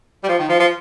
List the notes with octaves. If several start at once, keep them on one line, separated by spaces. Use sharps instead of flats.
G3
F3
D#3
F3
F3